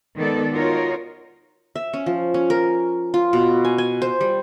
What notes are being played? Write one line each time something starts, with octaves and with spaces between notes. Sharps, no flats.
D#3 G#3 B3 A4 D5
D#4 F4 F#4 A#4 C#5
E5
C#4
F3
C#4
A#4
F4
B2
G#5
G#5
C5
G3